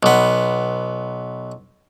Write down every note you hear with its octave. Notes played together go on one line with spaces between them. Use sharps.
B1 B3